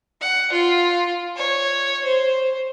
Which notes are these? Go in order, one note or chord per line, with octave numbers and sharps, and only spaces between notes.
F#5
F4
C#5
C5